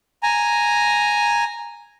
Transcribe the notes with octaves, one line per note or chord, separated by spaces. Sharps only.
G#5 A#5